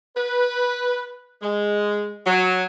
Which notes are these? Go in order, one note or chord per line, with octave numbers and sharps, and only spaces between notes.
B4
G#3
F#3